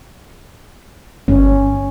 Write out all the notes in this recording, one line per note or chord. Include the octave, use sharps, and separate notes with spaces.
G1 C#4